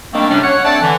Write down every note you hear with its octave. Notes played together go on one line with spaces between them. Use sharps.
D#3 G3 A3 A#3 C4 D4
A2 C3 G3 C#4 D4
C#5 F#5
A3 C4 D4 D5 F#5 A5
D3 E3